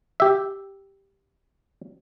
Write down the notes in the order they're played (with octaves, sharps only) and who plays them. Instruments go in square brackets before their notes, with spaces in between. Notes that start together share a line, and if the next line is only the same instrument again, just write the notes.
[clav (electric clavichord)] G4 E5